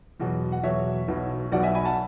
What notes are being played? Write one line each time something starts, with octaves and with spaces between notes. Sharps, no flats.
E2 B2 F#3
F#5
E2 B2 F#3 C#5 E5
B1 B2 F#3
B1 B2 F#3 D5 F#5
E5 G#5
G#5 B5
F#5 A5